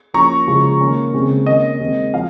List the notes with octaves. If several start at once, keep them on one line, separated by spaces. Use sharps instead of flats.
F3 A#3 C#4 A#5 C#6
C#3 F3 G#3
D#3 A#3 C#4
C#3 G#3 C4
D#3 A#3 C#4 D#5
D#3 G#3 C4
F3 F5